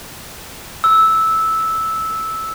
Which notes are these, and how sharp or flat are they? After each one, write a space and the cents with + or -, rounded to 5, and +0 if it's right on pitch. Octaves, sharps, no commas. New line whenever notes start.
E6 -10